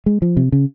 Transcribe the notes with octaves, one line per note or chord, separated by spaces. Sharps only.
G#3
F3
C3
C#3